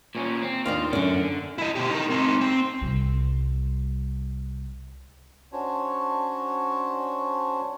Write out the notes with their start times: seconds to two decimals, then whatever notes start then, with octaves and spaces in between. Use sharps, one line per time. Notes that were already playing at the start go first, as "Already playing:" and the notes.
0.15 A#2 C#4
0.42 C4
0.66 D#2 D4 D#4 F4
0.93 F#2 D3 C#4
1.58 E4 D#5
1.75 B2 G4
1.91 D#4 A#4
2.10 C4 D#4
2.41 C4
2.81 C2 G3
5.52 C#4 D4 F#4 C5 C#5